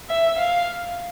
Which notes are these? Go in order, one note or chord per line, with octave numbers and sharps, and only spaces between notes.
E5
F5